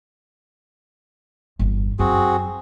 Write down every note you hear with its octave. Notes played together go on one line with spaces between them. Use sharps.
G1 E2
F#2 C4 F#4 G#4